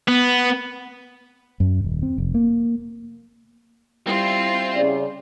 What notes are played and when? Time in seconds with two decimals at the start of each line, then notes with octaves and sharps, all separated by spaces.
0.08 B3
1.60 F#2
1.84 D#1
2.02 C4
2.18 F1
2.34 A#3
4.07 G3 C4 E4 F4
4.74 C#3 D5